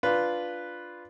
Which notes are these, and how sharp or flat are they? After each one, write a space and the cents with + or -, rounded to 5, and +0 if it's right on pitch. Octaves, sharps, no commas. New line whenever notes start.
D4 +0 F4 +0 B4 +0